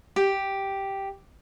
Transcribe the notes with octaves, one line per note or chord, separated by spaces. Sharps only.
G4